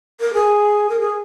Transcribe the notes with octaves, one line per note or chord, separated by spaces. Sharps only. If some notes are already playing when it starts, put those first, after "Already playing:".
A#4
G#4
A#4
G#4